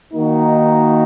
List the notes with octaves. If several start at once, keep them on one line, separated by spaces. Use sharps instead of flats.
D#3 A#3 D#4 F#4